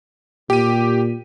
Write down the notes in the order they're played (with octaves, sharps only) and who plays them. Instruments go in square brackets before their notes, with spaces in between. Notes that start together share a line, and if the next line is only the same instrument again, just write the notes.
[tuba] A#2 [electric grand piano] G4 D#7